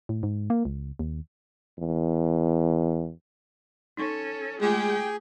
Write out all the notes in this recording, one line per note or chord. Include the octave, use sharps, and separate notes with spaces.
A2
G#2
A#3
C#2
D#2
E2
C#4 D#4 A4 C#6
G#3 A3 F4 G4 G#4 G5